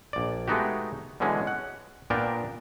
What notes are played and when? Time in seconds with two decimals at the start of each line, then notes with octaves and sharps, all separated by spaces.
0.13 A#1 D5
0.48 G#3 A3 B3 D#4 F#4 G4
1.20 B2 D3 E3 G#3 C#4
1.47 F#5
2.10 A#2 B3 D4 A#4 G5 A5